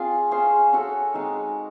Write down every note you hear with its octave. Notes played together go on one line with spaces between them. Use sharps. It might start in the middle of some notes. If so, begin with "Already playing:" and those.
Already playing: C4 F4 G#4 D5
C#4 F4 G#4 C5
C#4 F#4 A4
G#3 C4 D#4